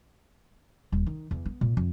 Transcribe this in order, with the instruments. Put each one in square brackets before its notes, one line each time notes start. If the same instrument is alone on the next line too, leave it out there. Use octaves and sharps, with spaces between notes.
[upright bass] D#1
D#3
E2
B3
A#2
F2